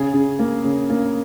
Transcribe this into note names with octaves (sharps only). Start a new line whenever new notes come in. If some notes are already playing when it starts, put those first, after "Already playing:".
Already playing: C#3 G#4
C#3
A#3
C#3
A#3